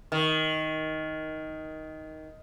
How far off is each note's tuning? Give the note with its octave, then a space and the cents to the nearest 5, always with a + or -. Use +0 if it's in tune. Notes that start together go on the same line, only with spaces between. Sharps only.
D#3 +10